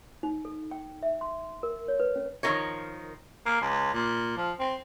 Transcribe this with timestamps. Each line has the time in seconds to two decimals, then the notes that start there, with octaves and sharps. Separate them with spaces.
0.23 D#4
0.45 A4
0.71 G5
1.03 E5
1.21 C6
1.63 A#4
1.88 C#5
2.00 B4
2.16 C#4
2.43 D#3 F3 E4 F4 A#4 C#5
3.46 A#3
3.61 C#2
3.94 A#2
4.37 F3
4.60 C4